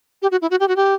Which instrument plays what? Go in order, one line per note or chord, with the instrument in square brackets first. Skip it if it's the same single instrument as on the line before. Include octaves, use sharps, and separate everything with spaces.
[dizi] G4
F#4
E4
F#4
G4
F#4
G4